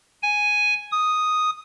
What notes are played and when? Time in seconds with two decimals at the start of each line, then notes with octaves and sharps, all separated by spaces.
0.23 G#5
0.92 D#6